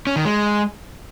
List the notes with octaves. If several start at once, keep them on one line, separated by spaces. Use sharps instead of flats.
C#4
D#3
G#3